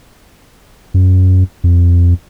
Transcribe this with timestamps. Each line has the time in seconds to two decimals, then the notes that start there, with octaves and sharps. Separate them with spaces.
0.94 F#2
1.64 F2